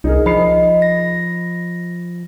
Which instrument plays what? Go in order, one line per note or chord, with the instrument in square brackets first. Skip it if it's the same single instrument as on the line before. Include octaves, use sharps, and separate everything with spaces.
[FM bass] C2 [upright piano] D#4 G#4 A#4
[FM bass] F3 [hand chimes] D#5 [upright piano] B5 C7
[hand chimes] A#6